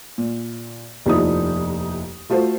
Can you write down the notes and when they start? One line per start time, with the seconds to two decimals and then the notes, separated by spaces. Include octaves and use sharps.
0.18 A#2
1.06 F1 D#2 F3 D#4 E4 D#6
2.30 A3 F4 F#4 A4 C5